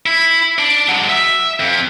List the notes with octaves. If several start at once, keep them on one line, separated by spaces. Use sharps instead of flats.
E4
D4 D5
F#3 G#3
E5
F2